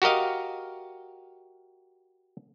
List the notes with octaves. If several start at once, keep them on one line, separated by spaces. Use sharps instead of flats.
F#4 G4 A#4 D#5 F5